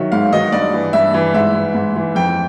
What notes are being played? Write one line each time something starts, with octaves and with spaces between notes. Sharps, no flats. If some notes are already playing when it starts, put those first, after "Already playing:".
Already playing: D#3 F#3 E5
G#2 F5
D#3 F#3 D#5
G2 D5
E3
G2 E5
E3
G#2 E5
E3
G#2
E3
F2 G5